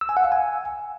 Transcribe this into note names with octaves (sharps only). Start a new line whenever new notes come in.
E6
G#5
F#5
F5
G#5